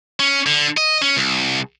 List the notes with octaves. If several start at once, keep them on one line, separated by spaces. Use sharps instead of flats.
C#4
D3
D#5
C#4
C2